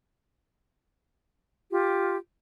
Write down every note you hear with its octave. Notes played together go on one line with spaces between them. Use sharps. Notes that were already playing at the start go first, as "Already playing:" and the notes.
F4 G4